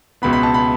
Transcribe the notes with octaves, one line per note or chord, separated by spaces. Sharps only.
C#2 B2 B3 B5
B5
A5
B5